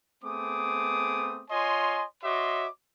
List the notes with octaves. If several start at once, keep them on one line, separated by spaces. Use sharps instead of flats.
A3 B3 C4 G#4 D6 D#6
F4 C#5 D#5 G#5 C6
F#4 C#5 D#5 E5 C6 D6